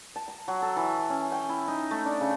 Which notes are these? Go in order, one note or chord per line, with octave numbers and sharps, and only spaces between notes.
A5
A#5
F#3
A4
E3
C#4
G5
E4
D#4
A3
D4
C#3